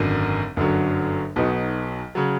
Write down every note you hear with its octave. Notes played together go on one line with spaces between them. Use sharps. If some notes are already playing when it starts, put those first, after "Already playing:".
Already playing: G#1 F#2 D3
G1 F#2 D3 F#3
B1 B2 F#3 B3 D#4
C#3 F#3